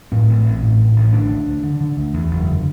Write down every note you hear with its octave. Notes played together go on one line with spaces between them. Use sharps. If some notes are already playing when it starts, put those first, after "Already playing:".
A2 C4
A1
A1
A2
A2
A1
D3 D4
D2
D2
D3
D3
D2
E2
F#1
D3